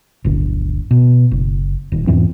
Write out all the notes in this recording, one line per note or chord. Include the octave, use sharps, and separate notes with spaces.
D1 G1 D3
B2
F#1
D#1 D#2
E2 G#2 E3 C4